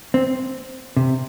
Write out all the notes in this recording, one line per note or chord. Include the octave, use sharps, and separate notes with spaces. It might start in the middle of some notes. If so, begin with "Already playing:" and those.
C4
C3